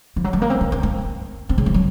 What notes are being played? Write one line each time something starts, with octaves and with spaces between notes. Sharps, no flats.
F3
F#3
G#3
A#3
C4
A#3
C#4
C4
C4
C#3
F3
F#3